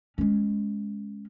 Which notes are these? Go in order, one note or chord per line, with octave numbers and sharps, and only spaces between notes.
G#3 C#4